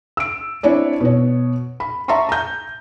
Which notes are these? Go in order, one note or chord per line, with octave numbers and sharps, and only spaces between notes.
E6 D7
C4 D4 E4 C#5 D5
B2 C#5
B5
E5 A5 A#5 C6 C#6
A#5 G6